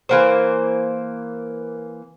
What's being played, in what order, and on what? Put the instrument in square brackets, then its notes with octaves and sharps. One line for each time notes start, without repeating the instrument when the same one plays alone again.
[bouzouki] E3 A#3 C5